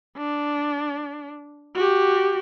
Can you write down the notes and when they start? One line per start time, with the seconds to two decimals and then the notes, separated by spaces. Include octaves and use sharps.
0.17 D4
1.76 F#4 G4